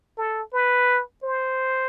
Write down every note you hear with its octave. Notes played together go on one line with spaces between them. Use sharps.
A4
B4
C5